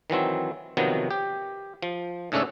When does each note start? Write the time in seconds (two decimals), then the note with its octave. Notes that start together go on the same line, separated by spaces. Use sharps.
0.10 D#3 E3 F#3 C4
0.77 C3 D#3 F3 F#3 B3
1.11 G4
1.82 F3
2.32 G#2 C#3 A3 C#4 D4 A4